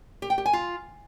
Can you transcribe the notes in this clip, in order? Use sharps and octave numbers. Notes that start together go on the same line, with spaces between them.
G4
G5
G4
G#5
F4